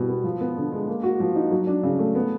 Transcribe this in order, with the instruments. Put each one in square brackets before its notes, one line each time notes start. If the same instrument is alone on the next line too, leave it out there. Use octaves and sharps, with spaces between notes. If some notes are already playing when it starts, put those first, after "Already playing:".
Already playing: [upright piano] B2 G3 E4
B3
F3
B3
D3
G#3
A#3
F#4
F3
D#4
F#3
D4
C#3
A3
B3